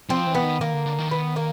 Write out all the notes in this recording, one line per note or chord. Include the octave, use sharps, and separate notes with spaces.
F3 C4
E3
B3
D#3
D#3 A#3
D3
D3
D#3
B3
A#3